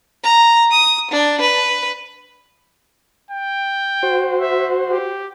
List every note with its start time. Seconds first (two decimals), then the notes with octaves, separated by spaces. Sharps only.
0.23 A#5
0.71 D#6
1.11 D4
1.41 B4
3.31 G5
4.03 F#4 C5
4.39 E5
4.89 G4